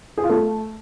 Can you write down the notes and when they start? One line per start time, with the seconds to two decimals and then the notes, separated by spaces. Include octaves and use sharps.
0.18 G#4
0.24 F4
0.30 A3